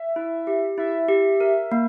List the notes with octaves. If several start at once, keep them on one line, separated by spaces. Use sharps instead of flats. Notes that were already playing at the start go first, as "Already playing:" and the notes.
Already playing: E5
E4
G4
E4 E5
G4
A#4
A#3